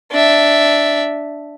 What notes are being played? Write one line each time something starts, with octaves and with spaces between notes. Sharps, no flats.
D4 E5